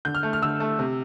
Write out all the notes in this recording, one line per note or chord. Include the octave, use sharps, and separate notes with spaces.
D3 G6
F6
A3
F6
D3 E6
A3
C3